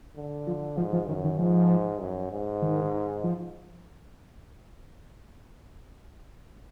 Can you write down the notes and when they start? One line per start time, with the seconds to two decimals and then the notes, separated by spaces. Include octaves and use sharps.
0.16 D3
0.47 F3
0.77 G#2 F3
0.93 F3
1.08 F#2 D#3
1.24 D#3
1.39 G#2 F3
2.01 F#2
2.32 G#2
2.62 D#3
3.24 F3